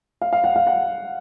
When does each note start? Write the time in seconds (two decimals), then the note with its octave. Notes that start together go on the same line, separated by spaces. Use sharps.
0.22 F5
0.33 F5
0.44 F#5
0.56 F5
0.67 F#5